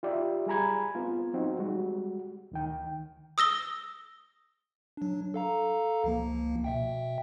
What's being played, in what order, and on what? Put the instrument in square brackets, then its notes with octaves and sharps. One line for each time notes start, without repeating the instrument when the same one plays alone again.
[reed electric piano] F4 G4 D5 E5
G3 G#4 G#5 A#5 B5 G#6
B3 C4 F4
F#3 C4 D#4 F#4
G3 G#3 F#4
D2 D#3 G5
[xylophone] D#6 E6 A#6 G7
[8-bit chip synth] F#3 D4
A4 F5 A#5
C#2 F3 A#3
B2 E5 G5